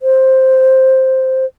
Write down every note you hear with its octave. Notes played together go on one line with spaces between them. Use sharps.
C5